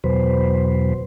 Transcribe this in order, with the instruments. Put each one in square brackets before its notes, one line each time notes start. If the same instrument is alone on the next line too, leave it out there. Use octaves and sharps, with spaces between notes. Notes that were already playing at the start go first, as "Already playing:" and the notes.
[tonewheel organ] E2 B2 F#3 B4 C5